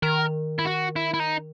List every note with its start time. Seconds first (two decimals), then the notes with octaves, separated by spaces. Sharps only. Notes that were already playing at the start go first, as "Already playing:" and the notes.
0.02 D#3 A#4
0.59 E4
0.65 F#4
0.96 E4
1.14 E4
1.20 D#4